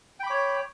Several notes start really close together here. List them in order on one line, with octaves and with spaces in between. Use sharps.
G5 B5 D6 C#5